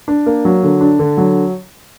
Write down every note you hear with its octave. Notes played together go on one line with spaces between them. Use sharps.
D4
A#3
F#3
D3
D4
D3
F#3